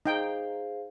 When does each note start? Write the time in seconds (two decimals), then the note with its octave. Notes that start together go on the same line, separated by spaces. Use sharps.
0.06 D#4 G#4 C5 F5 G5